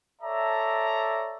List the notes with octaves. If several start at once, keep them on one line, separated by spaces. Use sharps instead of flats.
A4 C#5 D5 E5 A5 A#5